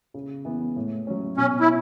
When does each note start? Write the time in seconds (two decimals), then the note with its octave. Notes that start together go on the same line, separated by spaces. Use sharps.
0.14 C#3
0.45 E3 B3
0.76 A2
1.07 F#3 C#4
1.37 B2 C#4
1.60 E4